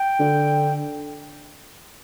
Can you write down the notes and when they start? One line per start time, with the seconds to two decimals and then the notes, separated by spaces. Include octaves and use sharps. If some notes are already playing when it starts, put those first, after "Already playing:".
Already playing: G5
0.20 D3